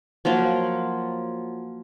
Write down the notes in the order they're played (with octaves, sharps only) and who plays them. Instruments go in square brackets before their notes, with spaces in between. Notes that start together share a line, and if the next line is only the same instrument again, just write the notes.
[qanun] F3 F#3 A#3 F4